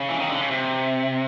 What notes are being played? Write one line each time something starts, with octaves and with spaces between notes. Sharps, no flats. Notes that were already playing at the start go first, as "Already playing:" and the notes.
Already playing: C#3
E3
D#3
D3
C#3
C3